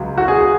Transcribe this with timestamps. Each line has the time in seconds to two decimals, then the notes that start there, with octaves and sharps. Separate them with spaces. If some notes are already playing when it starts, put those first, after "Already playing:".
Already playing: C#2 C#3 F#3
0.18 F#4
0.28 G#4